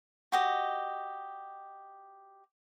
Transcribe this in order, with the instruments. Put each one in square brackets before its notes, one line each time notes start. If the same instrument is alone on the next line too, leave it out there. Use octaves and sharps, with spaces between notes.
[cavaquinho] F#4 G4 D#5